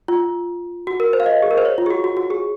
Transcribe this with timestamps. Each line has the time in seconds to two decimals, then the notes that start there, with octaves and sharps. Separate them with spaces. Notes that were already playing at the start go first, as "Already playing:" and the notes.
0.08 F4
0.87 F#4
1.00 A#4
1.13 C5
1.20 F5
1.26 D#5
1.42 G#4
1.51 A#4
1.58 C5
1.65 C#5
1.78 F4
1.86 G#4
1.91 F#4
2.04 F#4
2.17 F#4
2.30 G#4